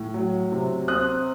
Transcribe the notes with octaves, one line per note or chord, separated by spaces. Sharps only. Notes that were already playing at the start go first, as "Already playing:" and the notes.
Already playing: A2
F#3
C3
C4 D#6 F#6